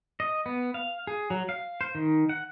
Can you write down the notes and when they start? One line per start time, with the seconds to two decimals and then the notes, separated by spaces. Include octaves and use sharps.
0.20 D#5
0.46 B3
0.74 F5
1.07 G#4
1.30 F#3
1.49 F5
1.81 C5
1.95 D#3
2.29 F#5